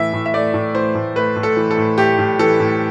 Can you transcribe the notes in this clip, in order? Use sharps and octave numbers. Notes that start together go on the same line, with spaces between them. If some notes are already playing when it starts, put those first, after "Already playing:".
Already playing: A2 E3 A3 E5
A2
E5
A3 D5
A2
E3 C5
A2
A3 B4
A2
A4
E3
A4
A2
A3 G4
A2
E3 A4
A2